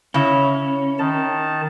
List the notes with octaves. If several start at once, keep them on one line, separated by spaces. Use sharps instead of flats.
C#3 C#4 E4
D#3 A5